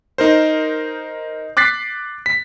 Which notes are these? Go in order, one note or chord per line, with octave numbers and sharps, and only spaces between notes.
D#4 A#4 C5
D6 F#6 A6 B6 C7
B6